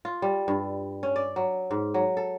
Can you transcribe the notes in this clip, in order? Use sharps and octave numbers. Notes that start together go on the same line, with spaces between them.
F4
G3
G2
C#4
D5
F#3
G#2
F#3
A4